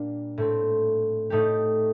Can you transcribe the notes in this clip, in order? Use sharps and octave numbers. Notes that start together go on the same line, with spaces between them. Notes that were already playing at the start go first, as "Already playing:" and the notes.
Already playing: A#2 G3 A#3 D4
A2 A3 C4
A2 A3 D#4 G4